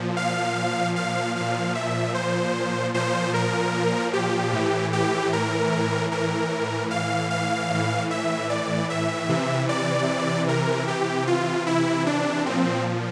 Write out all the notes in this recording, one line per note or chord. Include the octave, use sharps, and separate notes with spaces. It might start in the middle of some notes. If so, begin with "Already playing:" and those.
Already playing: A#2 F3
F5
F5
A#2 F3 F5
E5
C5
A#2 F3 C5
A#4
G4
A2 E3
G4
A#4
A2 E3 A#4
F5
F5
A2 E3
E5
D5
E5
C3 E3
D5
A#4
C3 E3 G4
F4
E4
D4
A#2 F3 C4